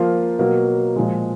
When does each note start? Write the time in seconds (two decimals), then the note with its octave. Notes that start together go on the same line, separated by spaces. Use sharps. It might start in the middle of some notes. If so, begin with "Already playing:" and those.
Already playing: F3 A#3 F4
0.39 B2 F#3 A#3
0.96 A#2 F3 G#3